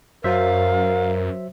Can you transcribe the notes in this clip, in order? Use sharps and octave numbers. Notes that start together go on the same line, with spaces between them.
F#2 F#3 A#4 C5 E5 F5